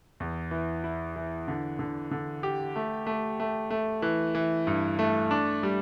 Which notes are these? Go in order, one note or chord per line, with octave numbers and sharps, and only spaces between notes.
E2
E3
E4
E3
D3
D3
D3
G4
A3
A3
A3
A3
E3
E3
G2
A3
D4
G3